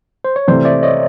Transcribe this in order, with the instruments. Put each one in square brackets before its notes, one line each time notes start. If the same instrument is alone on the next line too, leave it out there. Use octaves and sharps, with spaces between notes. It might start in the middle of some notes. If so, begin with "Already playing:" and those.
[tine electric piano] C5
C#5
[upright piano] C3 E3 A3 [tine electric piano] C5 D5
[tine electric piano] D5 E5
C#5 D#5